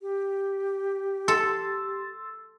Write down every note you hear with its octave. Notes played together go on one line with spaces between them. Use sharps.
G4
A4 C6 E6 A6